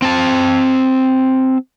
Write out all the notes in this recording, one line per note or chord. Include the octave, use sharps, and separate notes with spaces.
C4 A5